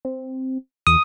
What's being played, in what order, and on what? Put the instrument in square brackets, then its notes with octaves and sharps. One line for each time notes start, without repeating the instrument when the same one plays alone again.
[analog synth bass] C4
[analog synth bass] E2 [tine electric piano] D#6